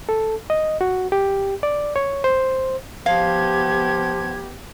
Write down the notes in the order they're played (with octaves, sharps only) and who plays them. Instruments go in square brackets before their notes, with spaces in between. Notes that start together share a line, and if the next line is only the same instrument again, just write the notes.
[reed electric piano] A4
D#5
F#4
G4
D5
C#5
C5
[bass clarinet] F3 [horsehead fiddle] B3 G4 [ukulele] F5 [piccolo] G#6